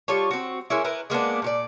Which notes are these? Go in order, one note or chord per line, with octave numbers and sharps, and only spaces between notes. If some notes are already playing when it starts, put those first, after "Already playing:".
G3 F4 A4 C#5
C4 F#4
G#3 A#3 C#4 E4
E4 A#4 B4
G#3 A#3 B3 D4
A#2 F4 D5